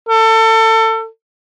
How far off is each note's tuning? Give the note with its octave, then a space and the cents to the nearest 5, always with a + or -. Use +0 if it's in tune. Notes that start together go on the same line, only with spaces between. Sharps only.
A4 +30